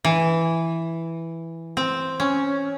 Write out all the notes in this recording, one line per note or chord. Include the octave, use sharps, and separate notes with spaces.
E3
C4
C#4